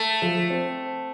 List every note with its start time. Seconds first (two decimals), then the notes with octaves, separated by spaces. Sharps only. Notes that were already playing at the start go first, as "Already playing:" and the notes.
Already playing: A3
0.22 F3
0.50 C4